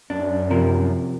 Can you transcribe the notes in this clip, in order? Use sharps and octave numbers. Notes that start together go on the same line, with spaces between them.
F#2 D4
C3 F3 A#4